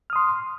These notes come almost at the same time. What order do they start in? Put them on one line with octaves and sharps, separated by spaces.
F6 D#6 C6